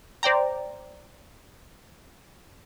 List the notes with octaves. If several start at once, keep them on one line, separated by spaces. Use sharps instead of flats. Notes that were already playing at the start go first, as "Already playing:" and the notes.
C5 D5 G5 A#5